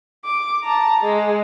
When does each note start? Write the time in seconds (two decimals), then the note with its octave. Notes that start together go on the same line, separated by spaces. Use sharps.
0.25 D6
0.64 A5 A#5
1.02 G#3